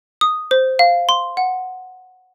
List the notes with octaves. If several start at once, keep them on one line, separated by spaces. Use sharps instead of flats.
D#6
C5
F5
C6
F#5